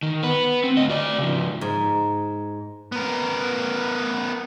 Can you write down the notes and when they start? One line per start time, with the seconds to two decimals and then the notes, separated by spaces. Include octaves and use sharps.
0.03 D#3
0.23 B3 B4
0.64 C4
0.77 D2 D#5
0.89 F#4 D5
1.18 C#3 F3
1.61 G#2
2.92 B3 A#4